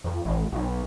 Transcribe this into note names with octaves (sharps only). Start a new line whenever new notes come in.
F2
A1
B1